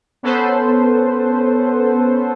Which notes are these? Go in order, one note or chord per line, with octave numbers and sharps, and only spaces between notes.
B3 C#4 A4 B4 C5